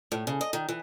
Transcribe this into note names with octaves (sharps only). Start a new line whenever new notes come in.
A2
C#3
D#5
D#3
E3